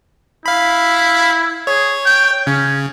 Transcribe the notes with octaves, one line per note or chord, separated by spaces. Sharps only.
E4 F5 B5
G#4 C#5
G5
C#3 C#4